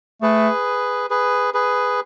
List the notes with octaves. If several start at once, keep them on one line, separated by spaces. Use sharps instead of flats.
A3 G#4 B4
G#4 B4
G#4 B4